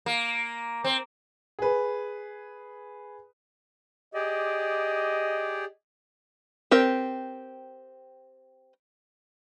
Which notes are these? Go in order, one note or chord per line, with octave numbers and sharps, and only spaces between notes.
A#3
C4
G#4 B4
G4 G#4 D5 D#5
C4 G4 A#4 G5